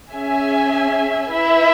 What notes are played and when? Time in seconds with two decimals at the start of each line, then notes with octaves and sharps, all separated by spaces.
0.13 C#4 G#4 E5 G#5
1.29 E4 B4 E5